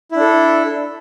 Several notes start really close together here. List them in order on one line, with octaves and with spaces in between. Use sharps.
E4 D4 A4